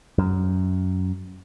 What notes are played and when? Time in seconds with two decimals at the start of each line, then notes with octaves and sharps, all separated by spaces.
0.18 F#2